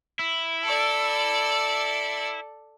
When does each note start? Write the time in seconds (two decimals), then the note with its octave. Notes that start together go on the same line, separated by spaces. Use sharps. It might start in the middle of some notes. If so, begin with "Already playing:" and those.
0.19 E4
0.64 A4 D5